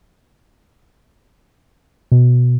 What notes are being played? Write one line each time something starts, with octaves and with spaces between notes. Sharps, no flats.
B2